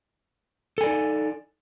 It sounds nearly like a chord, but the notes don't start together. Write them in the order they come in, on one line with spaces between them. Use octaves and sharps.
A4 G#5 D5 D#4